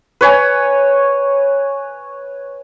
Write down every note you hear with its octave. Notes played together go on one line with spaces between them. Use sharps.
B4 C#5 G#5